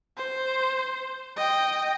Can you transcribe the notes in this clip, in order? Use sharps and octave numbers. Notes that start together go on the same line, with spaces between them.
C5
D#5 G5